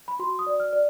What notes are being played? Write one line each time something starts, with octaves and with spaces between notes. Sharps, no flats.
B5
F#4 C6
D#6
D5
F6
D5